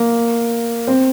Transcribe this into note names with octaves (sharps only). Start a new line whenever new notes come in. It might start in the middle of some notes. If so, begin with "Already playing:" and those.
Already playing: A#3
C4